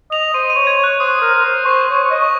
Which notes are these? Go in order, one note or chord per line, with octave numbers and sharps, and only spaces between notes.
D#5 F7
C5 D#7
D#7
C#5
G#6
C#5
F#6
C5 D#6
A#4
A#4
C5
C5 C#6
C#5
C#5
D#5
C#6